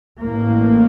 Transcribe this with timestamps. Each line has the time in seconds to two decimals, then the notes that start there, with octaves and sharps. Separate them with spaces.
0.20 A1 A2 A#3